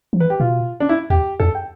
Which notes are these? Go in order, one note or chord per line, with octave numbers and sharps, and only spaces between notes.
F3
E3 B4
G4
B2 F4
D4
E4
E2 G4
F2 A4
G5